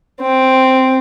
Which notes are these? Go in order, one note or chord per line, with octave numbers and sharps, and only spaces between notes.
C4